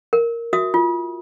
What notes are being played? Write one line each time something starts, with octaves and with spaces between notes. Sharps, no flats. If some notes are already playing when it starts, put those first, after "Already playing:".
A#4
F#4 E5 D#6
F4